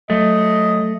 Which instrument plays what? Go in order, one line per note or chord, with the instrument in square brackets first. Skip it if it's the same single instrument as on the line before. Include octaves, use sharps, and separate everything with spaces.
[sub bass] F#3 [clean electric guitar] A3 [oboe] D#5